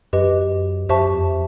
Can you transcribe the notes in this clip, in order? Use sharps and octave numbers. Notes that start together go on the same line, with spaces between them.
F#2 G4 B4 D#5
F#2 G4 C5 E5 A5 C#6
F2